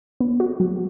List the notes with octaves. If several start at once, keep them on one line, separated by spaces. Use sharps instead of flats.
B3
F#4
F#3